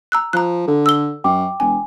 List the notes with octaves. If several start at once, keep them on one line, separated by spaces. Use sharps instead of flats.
A#5 E6 F#6
F3 A#5 F#6
D3 A4
E6 G7
F#2 G5 D6
E1 G#5